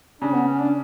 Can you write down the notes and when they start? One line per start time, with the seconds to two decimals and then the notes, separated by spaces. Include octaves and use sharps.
0.22 C#3 D4
0.34 B3
0.47 C#4
0.60 D4